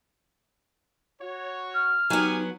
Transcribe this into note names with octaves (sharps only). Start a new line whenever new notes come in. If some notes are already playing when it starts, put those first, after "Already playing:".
F#4 C#5
F6
F#3 B3 D#4 G4 G#5